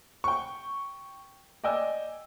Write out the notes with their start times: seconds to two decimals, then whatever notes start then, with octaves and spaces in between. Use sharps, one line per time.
0.24 G5 C#6
1.64 D5 D#5 G5 G#5 E6